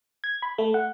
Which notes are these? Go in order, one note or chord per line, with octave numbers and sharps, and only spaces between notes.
G#6
B5
A3
F#5